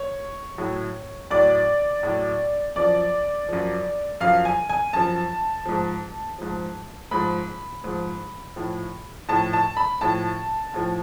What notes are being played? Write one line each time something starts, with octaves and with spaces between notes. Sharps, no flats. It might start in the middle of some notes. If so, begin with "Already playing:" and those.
Already playing: C#5
A2 F#3
A2 F#3 D5
A2 F#3
F#2 F3 D5
F#2 F3
F#2 F3 F5
G#5
G#5
F#2 F3 A5
G#2 F3
G#2 F3
G#2 F3 B5
G#2 F3
A2 F3
A2 F3 A5
A5
B5
A2 F3 A5
A2 F3